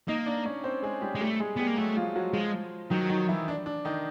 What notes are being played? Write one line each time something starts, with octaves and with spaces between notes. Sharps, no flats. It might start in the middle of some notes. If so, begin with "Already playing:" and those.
A#3 D#4 D#5
D4 D5
C#4 C#5
C4 C5
G#3 G#4
G3 G4
G#3
G3 A3 G4
G#3 G#4
G3 B3 G4
A#3
F#3 A3 F#4
F3 F4
F#3 F#4
F3 G#3 F4
D#3 F#3 D#4
D#3 D#4
E3 E4
D4
D4
D#3 D#4